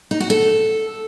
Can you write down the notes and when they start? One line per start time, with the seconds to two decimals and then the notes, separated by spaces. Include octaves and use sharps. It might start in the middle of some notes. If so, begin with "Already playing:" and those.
0.11 D#4
0.20 F#4
0.30 A4